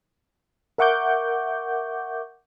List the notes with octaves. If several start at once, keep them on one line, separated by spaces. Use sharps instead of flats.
A#4 E5 F#5 C#6 D6 G6